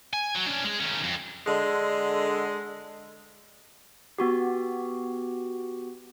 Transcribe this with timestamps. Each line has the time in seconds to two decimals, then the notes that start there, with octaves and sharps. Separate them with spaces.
0.13 G#5
0.35 F#3
0.47 C#4 D4
0.64 G#3 G#4
0.79 D#3 C#4
1.04 F2
1.47 D3 G#3
4.18 B3 F#4 G4